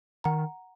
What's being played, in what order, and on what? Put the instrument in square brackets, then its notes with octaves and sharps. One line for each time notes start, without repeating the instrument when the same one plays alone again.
[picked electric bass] D#3 [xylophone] F#5 A#5